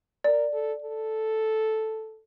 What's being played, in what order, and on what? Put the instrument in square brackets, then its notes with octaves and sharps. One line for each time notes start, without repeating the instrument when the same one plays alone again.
[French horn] A#4 [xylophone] D5
[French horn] A4
A4